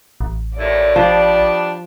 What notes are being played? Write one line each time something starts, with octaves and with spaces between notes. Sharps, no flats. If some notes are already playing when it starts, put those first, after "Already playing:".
A1
D#2 A2 D5
F3 G3 B3 D4